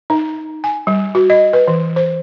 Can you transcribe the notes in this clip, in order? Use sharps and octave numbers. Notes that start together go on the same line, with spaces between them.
D#4
G#5
G3
F#4
D#5
B4
E3
C5